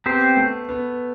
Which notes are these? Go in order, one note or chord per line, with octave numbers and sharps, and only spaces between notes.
B3 C4 G4 C5
A3
B3